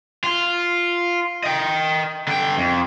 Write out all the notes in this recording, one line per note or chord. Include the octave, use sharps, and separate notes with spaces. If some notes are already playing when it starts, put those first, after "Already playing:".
F4
D#5 G5
D3 G5
F2